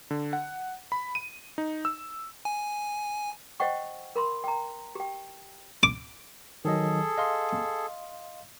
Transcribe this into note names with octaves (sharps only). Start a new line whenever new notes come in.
D3
F#5
B5
D#7
D#4
E6
G#5
C5 D#5 F#5 G5 C#6
A#4 B5 C6
G5 A#5
G4 G5
D6
D#3 F#3 G#4 A4 D#5
D#5 F5 C6